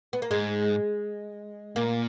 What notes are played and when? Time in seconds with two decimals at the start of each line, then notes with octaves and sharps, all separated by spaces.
0.13 B3
0.22 A#3
0.31 G#2 G#3
1.76 A#2 A#3